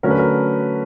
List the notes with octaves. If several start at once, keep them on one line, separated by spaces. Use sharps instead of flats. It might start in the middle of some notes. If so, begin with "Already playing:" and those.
D3 F#3 A3 C#4 A#4
B4
A#4